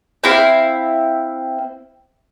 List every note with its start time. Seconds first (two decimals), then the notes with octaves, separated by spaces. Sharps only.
0.24 C4 E4 F5